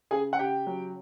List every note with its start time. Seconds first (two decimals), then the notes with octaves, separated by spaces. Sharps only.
0.11 C#3 G#4 G#5
0.33 F#5
0.39 C#3 G4 G5
0.67 F#3